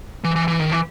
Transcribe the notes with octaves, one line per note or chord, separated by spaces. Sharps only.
E3
E3
E3
D#3
E3